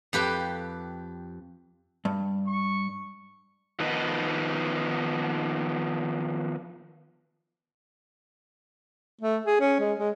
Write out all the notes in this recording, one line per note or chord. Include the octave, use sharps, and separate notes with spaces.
F2 G4 B4 G5
G2
C#6
D#3 F3 B3 D#4 B4 D#5
A3
G#4
C#4
G#3
G#3